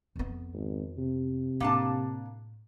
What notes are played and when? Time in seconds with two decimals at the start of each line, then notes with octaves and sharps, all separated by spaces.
0.16 F2 B3
0.53 G#1
0.97 C3
1.60 A2 A#3 D4 A5